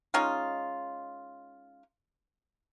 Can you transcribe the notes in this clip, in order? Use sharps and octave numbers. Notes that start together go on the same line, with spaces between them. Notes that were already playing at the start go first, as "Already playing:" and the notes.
G#3 C#4 D#4 F4